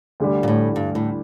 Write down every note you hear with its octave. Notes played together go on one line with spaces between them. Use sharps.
D2 D3 G3
A#2
A2
G2
A2